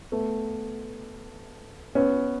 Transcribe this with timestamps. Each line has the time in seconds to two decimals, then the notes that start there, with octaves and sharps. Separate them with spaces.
0.12 A3 B3
1.95 B3 C#4